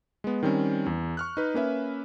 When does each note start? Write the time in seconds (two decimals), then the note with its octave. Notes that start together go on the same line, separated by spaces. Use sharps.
0.24 G#3 B3
0.43 D#3 G3 C4 C#4
0.86 E2
1.17 C#6 F6 F#6
1.37 D#4 B4
1.54 A#3 C#4 B4 E5